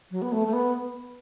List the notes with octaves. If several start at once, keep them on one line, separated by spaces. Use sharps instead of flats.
F#3
B3
A3
A3
B3